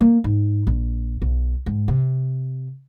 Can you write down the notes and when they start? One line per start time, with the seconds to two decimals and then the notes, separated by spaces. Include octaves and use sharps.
0.01 A#3
0.24 G#2
0.67 A#1
1.22 B1
1.66 G#2
1.88 C3